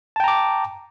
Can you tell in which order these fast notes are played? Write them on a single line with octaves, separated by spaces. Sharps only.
A5 G5 A#5 D6